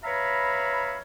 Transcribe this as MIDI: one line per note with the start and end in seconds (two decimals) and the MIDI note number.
0.04 0.98 71
0.04 0.98 73
0.04 0.98 76
0.04 0.98 77
0.04 0.98 82
0.04 0.98 83